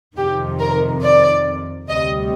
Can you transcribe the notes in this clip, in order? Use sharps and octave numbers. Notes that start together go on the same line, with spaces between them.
F2 C3 D#3 G4
A#4
D5
D2 C3 G3 D#5